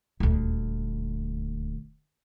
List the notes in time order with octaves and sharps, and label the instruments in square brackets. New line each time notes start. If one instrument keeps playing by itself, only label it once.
[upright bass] D#1 D2